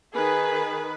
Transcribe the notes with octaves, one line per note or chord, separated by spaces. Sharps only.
D#3 G#4 B4